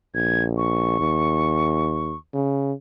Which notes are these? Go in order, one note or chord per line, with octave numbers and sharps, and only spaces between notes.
A#1 G#6
C#6
D#2
C#3